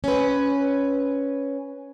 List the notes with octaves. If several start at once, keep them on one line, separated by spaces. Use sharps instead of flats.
C#4 B4